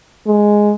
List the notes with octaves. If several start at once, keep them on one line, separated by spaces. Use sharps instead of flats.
G#3